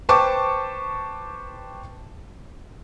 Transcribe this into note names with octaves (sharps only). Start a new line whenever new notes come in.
B4 C5 G5 A5 C#6 D6